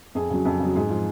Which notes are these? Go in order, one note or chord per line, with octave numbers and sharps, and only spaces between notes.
F2 G#4
C#3 F#3
F2
C#3 F#3
G#2 G#4
F3 F4